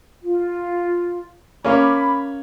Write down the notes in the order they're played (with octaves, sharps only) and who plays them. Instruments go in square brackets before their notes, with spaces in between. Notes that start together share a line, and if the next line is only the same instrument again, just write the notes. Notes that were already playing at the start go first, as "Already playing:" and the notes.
[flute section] F4
[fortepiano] A#3 C#4 [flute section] B5 D6